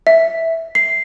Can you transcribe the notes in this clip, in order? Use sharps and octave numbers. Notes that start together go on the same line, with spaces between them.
E5
C7